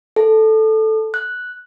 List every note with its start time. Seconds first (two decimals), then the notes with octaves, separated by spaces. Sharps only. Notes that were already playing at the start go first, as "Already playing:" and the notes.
0.16 A4
1.14 F#6